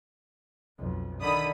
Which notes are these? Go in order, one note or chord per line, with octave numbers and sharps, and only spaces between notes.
B1 F2
D3 D#3 B5 D#6